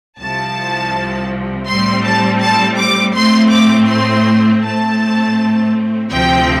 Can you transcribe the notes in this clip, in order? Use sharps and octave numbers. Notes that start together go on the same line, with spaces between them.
C2 C3 F3 A5
A2 G3 C4 C6
A5
A5
D6
A2 A3 C4 C6
D6
C6
A2 A3 C4 A5
D2 C3 F3 C4 G5